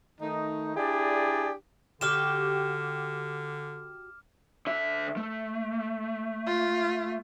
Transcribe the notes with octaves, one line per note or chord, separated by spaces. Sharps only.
D#3 A3 D#4
D4 E4 G4 G#4 D5
D3 F#4 G4 D6 F6 E7
D3 E5
A3
F4